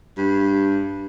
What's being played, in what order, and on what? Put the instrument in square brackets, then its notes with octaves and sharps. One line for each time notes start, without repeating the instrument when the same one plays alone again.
[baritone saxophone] G2